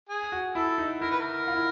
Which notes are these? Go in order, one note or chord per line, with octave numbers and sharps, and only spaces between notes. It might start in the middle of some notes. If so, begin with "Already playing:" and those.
G#4
F#4
E4 A4
D#4
E4 A#4
B4
A#4
F4
E4